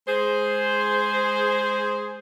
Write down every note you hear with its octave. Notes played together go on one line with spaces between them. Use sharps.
G#3 G#4 C5